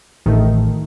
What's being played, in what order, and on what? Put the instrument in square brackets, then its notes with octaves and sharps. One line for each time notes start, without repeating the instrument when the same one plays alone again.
[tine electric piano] A1 [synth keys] D#3 A3 D#4